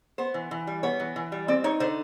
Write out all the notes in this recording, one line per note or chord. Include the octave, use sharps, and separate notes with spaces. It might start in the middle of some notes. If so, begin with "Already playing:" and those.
B3 C5
E3
E3
G3
B3 C#5
E3
E3
G3
C4 D5
D#4 C#5
D3 C5